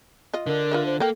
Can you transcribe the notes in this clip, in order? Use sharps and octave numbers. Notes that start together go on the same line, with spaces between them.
F4 D#5
D3 D4 A#4
F4 B4 E5
C5
A#3 A4 A#4 G5